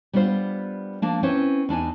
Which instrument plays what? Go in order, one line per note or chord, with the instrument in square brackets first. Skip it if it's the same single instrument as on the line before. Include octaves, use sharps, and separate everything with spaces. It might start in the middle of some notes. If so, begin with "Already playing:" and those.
[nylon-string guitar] G3 B3 D4 F4 C5
F3 A#3 D4
C4 C#4 E4 B4 C5
E2 D4 D#4 G#5